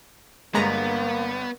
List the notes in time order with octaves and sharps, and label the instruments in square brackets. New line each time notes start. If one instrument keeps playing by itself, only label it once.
[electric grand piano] G1 G2 [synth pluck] G#3 A#5 [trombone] A#3 [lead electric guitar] B3